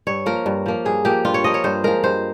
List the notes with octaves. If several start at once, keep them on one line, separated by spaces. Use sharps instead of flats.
G2 C#5
F3 A#3 A#4
G2
F3 A#3
G2 G#4
F3 A#3 G4
G2 F4
C#5
F3 A#3 D#5
C#5
G2 C5
F3 G#3 A#4
G2 C5